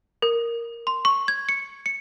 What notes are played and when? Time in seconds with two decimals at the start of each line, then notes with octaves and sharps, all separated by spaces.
0.22 A#4
0.87 C6
1.05 C#6
1.28 G#6
1.49 C#7
1.86 C#7